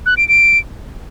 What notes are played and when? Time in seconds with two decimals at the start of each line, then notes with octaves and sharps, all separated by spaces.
0.06 F#6
0.17 D7
0.28 D7